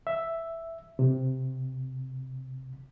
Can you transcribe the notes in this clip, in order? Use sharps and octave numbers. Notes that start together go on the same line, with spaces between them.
E5
C3